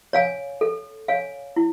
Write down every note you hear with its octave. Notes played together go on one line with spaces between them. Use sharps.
C#5 F5 G#5
A4
C#5 F5 G#5
E4